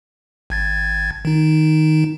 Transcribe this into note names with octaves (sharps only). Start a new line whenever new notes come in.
G#1 G#6 A6
D#3 D#4